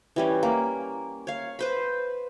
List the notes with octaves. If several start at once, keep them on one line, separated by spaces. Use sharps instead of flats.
E3 G3 C#4
A#3
C#5 F5
B4 C5 B5